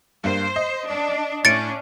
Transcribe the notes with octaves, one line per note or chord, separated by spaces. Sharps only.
G2 G3 A#3 C5
D#5
D4
A2 C#4 D4 A6 C#7 D7